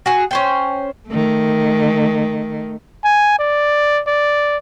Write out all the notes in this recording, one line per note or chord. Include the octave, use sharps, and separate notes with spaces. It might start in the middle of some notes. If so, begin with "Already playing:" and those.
F#4 G#4
C#4 C5 G5
D#3 A3
G#5
D5
D5